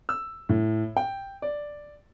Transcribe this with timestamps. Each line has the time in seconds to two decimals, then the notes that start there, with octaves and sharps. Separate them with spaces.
0.09 E6
0.49 A2
0.97 G5
1.42 D5